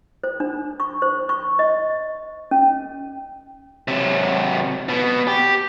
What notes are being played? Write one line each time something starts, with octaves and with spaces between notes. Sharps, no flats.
C5
D4
C#6
C5
C#6
D#5
C#4
C3 F#3
B2 B3
G4